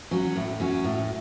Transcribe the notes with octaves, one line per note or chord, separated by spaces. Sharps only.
F#3 C#4 F#4
A2
F#3 C#4 F#4
A2